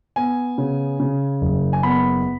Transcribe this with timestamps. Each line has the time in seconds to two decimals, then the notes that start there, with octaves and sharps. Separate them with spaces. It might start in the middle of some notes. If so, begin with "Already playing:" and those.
0.16 B3 G#5
0.58 C#3
1.00 C#3
1.41 F#1
1.73 G#5
1.83 B3 B5